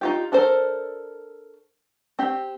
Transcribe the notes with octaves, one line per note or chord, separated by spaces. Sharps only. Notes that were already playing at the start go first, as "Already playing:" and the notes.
D#4 F4 G4
D4 A4 A#4 C5
C4 G4